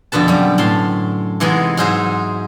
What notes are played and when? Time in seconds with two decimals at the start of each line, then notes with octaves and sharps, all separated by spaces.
0.12 F2 B2 D3 B4 A5
0.28 F#2 G3
0.58 A2 A5 C6
1.40 C3 E3 G#3 B3 D#4
1.77 G#2 F#3 D#4 G#4 C5 E5